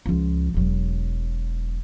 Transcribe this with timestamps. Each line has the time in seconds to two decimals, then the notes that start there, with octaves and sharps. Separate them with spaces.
0.06 C#2 F3
0.54 E1 F#3